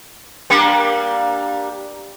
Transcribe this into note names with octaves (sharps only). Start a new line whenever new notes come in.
G3 A#3 D4